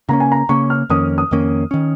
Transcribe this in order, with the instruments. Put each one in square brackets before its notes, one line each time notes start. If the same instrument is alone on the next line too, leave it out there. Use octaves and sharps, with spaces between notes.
[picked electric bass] C#3 A#3 C#4 [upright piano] A#5
[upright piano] G#5
A#5
[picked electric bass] C#3 A#3 C#4 [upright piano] C#6
[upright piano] F6
[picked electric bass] F2 D#3 A#3 C#4 [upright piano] D#6
[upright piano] D#6
[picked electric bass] F2 D#3 A#3 C#4
D#3 C#4